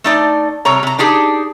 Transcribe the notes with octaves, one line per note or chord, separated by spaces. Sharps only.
A3 D#4 D5
C3 G3 C#5 A#5
C3 A#5
D4 D#4 G4 G#4